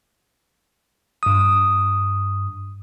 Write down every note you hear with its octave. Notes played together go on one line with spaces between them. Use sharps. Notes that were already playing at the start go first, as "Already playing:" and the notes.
G2 D#6